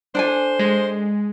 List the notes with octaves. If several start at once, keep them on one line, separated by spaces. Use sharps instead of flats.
D4 A4 C5 G#5
G#3